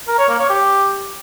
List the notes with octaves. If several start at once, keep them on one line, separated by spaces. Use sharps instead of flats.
A#4
C#5
A#3
C#5
G4